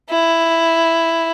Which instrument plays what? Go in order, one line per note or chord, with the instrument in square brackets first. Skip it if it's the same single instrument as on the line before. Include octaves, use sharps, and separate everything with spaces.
[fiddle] E4